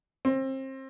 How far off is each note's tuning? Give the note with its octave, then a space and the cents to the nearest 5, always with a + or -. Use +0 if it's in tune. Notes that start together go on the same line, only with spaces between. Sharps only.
C4 +30